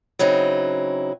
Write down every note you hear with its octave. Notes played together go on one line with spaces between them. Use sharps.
C#3 F#3 C4 D#4 E4